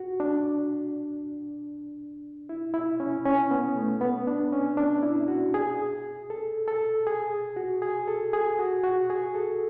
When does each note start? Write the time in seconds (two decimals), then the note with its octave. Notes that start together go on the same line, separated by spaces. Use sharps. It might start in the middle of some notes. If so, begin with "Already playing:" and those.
Already playing: F#4
0.20 D4
2.49 E4
2.74 E4
3.00 C#4
3.25 C#4
3.51 B3
3.76 A3
4.01 B3
4.27 D4
4.52 C#4
4.77 D4
5.03 E4
5.28 F#4
5.54 G#4
6.30 A4
6.68 A4
7.07 G#4
7.56 F#4
7.82 G#4
8.08 A4
8.33 G#4
8.59 F#4
8.84 F#4
9.10 G#4
9.35 A4